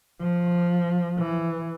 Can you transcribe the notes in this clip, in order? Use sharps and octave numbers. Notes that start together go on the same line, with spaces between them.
F3
E3